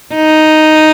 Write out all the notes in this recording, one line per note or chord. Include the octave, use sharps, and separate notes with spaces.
D#4